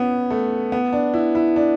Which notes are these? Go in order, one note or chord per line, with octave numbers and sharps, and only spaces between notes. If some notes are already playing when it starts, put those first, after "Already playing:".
Already playing: B3 C#4
A3
B3
D4
E4
E4
D4